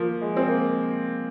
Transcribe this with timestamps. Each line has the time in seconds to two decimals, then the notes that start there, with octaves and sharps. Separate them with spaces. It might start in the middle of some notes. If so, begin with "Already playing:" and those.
Already playing: F3 A#3
0.21 G#3
0.37 C4
0.48 A#3